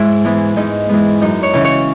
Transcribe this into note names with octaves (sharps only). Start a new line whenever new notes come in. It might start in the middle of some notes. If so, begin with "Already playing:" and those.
Already playing: G#2 E4
E3 G#3 B3
G#2 D#4
E3 G#3 B3
F#2 D#4
C#5
C#3 E3
C#5